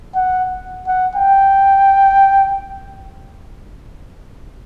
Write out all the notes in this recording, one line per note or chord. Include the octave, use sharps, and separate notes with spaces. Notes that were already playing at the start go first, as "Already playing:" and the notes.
F#5
F#5
G5